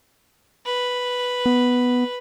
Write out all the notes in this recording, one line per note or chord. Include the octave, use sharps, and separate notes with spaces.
B4
B3